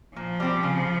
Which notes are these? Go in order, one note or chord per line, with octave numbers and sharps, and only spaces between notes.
A#2 F3
G3 C4 G4
C#3